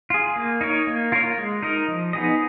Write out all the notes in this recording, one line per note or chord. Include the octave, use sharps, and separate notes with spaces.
F4 G#4
A#3
D#4 A#4 C#5
A#3
F4 A#4 C#5
G#3
D#4 A#4 D#5
F3
B3 D#4 G#4 D#5